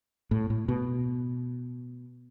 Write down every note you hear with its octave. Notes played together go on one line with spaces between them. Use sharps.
A2
A2
B2